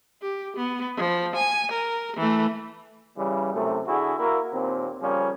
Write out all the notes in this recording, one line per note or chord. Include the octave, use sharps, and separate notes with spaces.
G4
B3
F3
G#5
A#4
E3 A3
C#3 E3 G3
F#2 A2 C3 A3
D3 E4 F#4 G#4
A#3 E4 F#4 A#4
D#2 A#2 C4
C#3 F3 G3 A#3 C#4